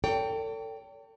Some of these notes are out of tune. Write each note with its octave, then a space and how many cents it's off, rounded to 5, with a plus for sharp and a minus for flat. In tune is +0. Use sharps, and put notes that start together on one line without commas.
A4 +35 C#5 +45 G5 +0